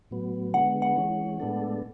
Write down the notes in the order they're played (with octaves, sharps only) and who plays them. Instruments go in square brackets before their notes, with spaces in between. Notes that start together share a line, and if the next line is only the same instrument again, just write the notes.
[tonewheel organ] A2 F#3 B3
[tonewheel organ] D3 G#3 B3 [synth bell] F#5
[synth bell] F#5
[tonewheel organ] E3 G#3 C#4
A2 G#3 B3 D4 A4